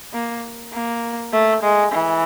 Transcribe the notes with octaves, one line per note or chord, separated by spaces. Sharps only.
A#3
A#3
A3
G#3
E3